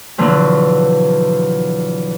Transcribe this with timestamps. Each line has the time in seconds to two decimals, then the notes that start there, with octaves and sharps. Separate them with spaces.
0.18 E2 B2 D3 F3 F#3